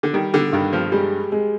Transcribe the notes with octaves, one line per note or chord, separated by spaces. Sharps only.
D3
D#3 G3
D3
G2 D#3
F3
G3 G#3
G#3